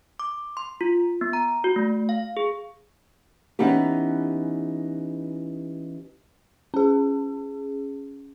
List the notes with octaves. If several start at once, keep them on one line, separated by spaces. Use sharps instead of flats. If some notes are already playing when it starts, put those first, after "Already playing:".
D6
C6
F4
B3
A#5
F#4
A3
F5
G#4
E3 B3 C#4 D#4 G4
C#4 G#4